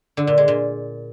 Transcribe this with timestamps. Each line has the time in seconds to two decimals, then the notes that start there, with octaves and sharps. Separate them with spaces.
0.17 D3
0.27 A#2
0.38 G#3
0.48 A#2